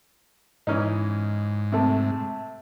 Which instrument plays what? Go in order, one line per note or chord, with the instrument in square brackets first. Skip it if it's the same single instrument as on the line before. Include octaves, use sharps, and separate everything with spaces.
[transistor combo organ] G#2 [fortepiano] E3 C#4 D#4
[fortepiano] C3 A3